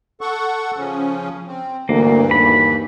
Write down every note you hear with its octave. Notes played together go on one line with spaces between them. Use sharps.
A4 F#5 C#6
C#3 F3 C#4
C4
D2 G2 E3 A#3
D#2 B5